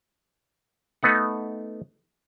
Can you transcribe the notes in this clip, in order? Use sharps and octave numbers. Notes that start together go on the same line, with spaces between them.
A3 B3 D#4 F#5